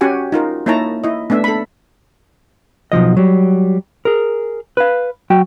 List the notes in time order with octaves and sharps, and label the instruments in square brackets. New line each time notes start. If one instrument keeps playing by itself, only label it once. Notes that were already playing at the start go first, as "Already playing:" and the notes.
[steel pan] C#4 F#4 G4 F#5 G#5
D#4 F4 A#4
A#3 D#4 E4 C#5 A5 A#5
E4 D#5
A3 B3 D4 E5
A4 B5
[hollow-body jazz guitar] B1 A2 F3 D#5
F#3 G3
G#4 A#4
B4 F5
F#3 F#4 G5